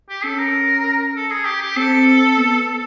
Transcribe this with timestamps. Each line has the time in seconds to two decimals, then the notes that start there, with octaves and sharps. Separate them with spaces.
0.09 G4
0.24 C#4 A4
0.39 A#4
1.16 A4
1.30 G#4
1.45 G4
1.61 G4
1.77 C4 A4
2.37 B3